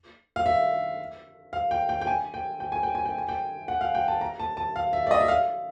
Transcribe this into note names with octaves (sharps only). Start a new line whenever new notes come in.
F5
E5
F5
G5
G5
G5
G#5
G5
G5
G#5
G5
G#5
G5
G#5
G5
F#5
F5
G5
A5
A#5
A5
A5
F5
E5
D5
D#5
E5
F5